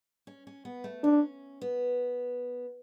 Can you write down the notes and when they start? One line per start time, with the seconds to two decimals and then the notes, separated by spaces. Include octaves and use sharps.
0.27 C#4
0.47 C#4
0.65 B3
0.84 A3
1.03 C#4 D4
1.61 B3